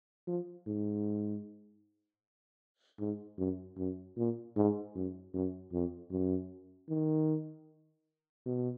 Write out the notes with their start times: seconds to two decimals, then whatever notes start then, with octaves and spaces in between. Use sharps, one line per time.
0.27 F3
0.67 G#2
3.00 G#2
3.38 F#2
3.78 F#2
4.18 A#2
4.57 G#2
4.95 F#2
5.34 F#2
5.73 F2
6.11 F#2
6.89 D#3
8.46 B2